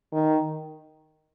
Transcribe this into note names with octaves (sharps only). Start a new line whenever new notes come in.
D#3